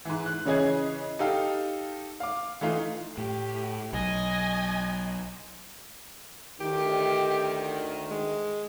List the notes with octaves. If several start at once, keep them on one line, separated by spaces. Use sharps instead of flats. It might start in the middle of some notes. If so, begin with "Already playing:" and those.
G#2 E3
F#6
C#3 E3 C#4 G#4 D#5 G#6
D#4 G4 A4 F5
F5 D6
E3 A3 D#4 F4
A2 G4
B1 D#5 G#5
D2 D#3 G4
G#3